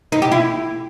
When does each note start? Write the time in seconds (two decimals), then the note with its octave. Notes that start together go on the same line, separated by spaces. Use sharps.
0.12 D#4
0.22 G4
0.32 E4